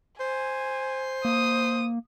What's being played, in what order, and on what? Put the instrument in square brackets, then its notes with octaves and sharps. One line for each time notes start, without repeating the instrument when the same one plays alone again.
[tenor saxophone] C5 [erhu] G#5
[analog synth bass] A#3 [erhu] D#6